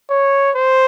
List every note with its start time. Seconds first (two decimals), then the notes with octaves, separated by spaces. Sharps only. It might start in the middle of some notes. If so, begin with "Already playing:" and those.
0.10 C#5
0.56 C5